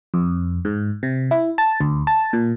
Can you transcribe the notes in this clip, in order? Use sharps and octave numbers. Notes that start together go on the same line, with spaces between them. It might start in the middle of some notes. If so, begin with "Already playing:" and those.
F2
G#2
C3
E4
A5
D2
A5
A#2